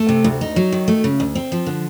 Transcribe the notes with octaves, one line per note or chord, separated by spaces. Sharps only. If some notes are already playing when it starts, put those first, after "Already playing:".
Already playing: A3
C3
D2
D#4
F#3
D#3
A3
C#3
D2
C4
F3
D3